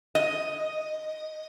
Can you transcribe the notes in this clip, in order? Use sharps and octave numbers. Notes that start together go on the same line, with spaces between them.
D#5